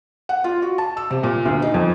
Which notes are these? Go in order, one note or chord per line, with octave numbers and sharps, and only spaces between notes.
F#5
F4
F#4
A5
E6
C3
A#2
D2
D#4
F2